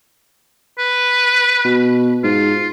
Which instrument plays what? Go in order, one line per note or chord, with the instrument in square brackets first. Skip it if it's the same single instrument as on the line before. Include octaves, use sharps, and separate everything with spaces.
[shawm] B4
[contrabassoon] B2
[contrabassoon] G#2 [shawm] F4